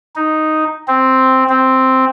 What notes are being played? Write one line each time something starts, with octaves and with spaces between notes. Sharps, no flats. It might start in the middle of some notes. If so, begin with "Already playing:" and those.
D#4
C4
C4